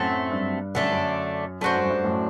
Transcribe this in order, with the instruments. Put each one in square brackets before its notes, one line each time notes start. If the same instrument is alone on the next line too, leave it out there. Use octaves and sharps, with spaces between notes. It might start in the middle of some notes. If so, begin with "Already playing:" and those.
Already playing: [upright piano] F#2 A2 [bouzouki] F#3 A3 C4
[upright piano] G2
[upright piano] F#2 [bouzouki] D3 A3 D4
[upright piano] G2
F#2
[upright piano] F#2 [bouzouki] A3 D4 F#4 C5
[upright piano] G2
F#2
G2
F#2 A2